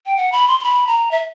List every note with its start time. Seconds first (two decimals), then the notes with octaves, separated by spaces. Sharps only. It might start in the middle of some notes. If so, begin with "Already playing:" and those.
0.06 G5
0.17 F#5
0.32 B5
0.48 C6
0.60 C6
0.64 B5
0.87 A#5
1.11 E5